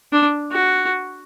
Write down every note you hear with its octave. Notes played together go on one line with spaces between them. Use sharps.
D4
F#4